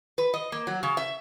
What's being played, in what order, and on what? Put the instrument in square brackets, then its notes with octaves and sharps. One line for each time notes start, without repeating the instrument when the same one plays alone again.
[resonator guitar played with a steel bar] B4
D#5
A#3
F#3
C#3
E5